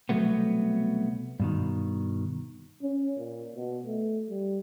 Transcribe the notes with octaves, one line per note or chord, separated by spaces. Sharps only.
C2 F2 B2 F#3 A3 B3
G2 B2 D#3
C#4
A#2
B2
A3
G3